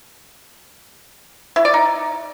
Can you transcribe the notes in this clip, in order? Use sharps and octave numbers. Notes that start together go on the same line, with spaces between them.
E4
D5
D#4